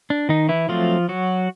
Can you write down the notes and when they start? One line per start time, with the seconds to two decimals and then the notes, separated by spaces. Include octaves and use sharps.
0.10 D4
0.29 D#3 D#4
0.49 E3 E4
0.69 F3 F#3 A3 C4 F4
1.09 F#3 F#4